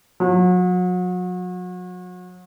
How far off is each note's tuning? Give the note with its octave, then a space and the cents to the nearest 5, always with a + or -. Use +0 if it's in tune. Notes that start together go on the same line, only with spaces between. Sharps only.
F#3 -35